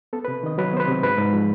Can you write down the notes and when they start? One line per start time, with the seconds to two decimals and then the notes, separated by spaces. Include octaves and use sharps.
0.13 B3 A4
0.25 B4
0.28 C3
0.43 D#3 D#5
0.58 F#3 B4
0.74 B3 C5
0.80 B4
0.87 C3
1.03 G#2 B4
1.18 G#2
1.33 F3